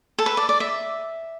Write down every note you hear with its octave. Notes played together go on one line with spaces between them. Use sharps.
A4
B4
D5
D5
E5